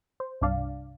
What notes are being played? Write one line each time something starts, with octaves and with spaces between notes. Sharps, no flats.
C5
C2 G2 D4 D5 F5